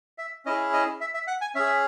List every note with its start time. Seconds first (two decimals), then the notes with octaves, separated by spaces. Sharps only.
0.18 E5
0.46 C#4 E4 G#4 D#5
0.73 D#5
1.01 E5
1.14 E5
1.27 F#5
1.41 G#5
1.55 C#4 G#4 E5